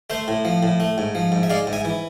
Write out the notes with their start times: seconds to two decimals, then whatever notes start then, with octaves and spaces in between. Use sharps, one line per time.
0.10 A3 C5 E5
0.28 A2
0.45 F3
0.63 A2
0.80 A3
0.98 G#2
1.15 F3
1.32 G#2
1.43 E5
1.50 G#3 D5 F5
1.67 G#2
1.73 E5 G#5
1.85 E3